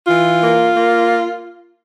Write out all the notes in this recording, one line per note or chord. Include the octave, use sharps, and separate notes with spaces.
E3 F4
A#3
A#3